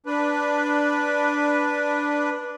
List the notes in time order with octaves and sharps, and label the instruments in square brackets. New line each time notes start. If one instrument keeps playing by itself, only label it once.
[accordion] D4 B4